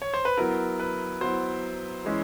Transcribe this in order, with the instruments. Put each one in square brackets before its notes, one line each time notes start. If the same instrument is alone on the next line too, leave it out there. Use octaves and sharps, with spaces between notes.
[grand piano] C#5
C5
B4
F#3 B3 E4 A#4
B4
F#3 B3 E4 C5
E3 G#3 C#4 E4